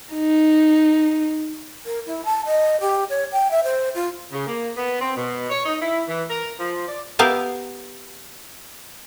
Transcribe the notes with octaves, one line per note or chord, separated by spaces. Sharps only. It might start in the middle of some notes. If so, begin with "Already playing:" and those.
D#4
A#4
E4
A5
D#5
G4
C#5
G5
E5
C5
F4
C#3
A#3
B3
C4
B2
C#5
D#4
E4
E3
A#4
F3
D5
B3 G4 A#4 E5 F5